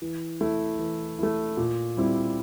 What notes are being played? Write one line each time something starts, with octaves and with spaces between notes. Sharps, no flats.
E3
A3 E4
E3
A3 E4
A#2
G3 C4 E4